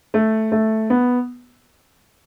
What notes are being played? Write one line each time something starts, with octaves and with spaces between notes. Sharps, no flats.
A3
A3
B3